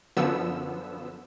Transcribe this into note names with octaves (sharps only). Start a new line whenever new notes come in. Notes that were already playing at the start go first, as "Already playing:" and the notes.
F#2 D3 F3 B3 E6